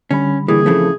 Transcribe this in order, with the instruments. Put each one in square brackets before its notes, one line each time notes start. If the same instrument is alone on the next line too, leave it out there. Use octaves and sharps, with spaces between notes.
[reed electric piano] D3 G3 B5 [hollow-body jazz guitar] C#4
[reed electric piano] D3 G3 A#3 [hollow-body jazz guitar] E3 [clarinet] G#4
[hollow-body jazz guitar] C#3 E3 A3 [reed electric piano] F3 C4 A4